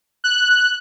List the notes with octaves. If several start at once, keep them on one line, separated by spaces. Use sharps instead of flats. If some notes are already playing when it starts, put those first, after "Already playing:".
F#6